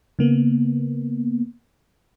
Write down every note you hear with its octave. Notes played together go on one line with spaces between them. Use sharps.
C#3 A#3 B3